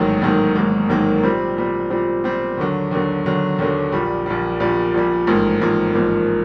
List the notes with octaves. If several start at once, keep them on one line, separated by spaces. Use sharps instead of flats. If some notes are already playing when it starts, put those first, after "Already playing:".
Already playing: A1 G#2 D#3 F#3 A#3
A1 G#2 D#3 F#3 A#3
A1 G#2 D#3 F#3 A#3
A1 G#2 D#3 F#3 A#3
A#2 G3 C4
A#2 G3 C4
A#2 G3 C4
A#2 G3 C4
D#2 D3 F#3
D#2 D3 F#3
D#2 D3 F#3
D#2 D3 F#3
A#1 A#2 G3
A#1 A#2 G3
A#1 A#2 G3
A#1 A#2 G3
A1 G#2 F3 A#3
A1 G#2 F3 A#3
A1 G#2 F3 A#3